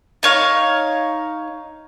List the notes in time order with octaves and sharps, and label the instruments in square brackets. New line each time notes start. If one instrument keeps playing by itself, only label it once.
[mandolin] D#4 C#5 F5